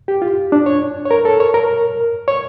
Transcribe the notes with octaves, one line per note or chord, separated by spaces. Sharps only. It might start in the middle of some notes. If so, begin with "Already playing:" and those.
G4
F4
D4
C#5
C#5
A#4
A4
C#5
A#4
C#5